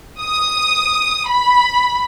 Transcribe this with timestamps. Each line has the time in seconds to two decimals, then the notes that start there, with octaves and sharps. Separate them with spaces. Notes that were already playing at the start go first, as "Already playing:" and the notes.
0.21 D#6
1.29 B5